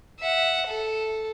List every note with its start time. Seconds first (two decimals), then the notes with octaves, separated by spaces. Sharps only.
0.19 E5 F#5
0.67 A4